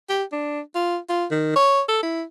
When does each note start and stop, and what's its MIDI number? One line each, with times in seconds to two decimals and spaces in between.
0.09 0.23 67
0.32 0.60 62
0.75 0.98 65
1.09 1.25 65
1.31 1.53 51
1.56 1.81 73
1.89 2.00 69
2.03 2.23 64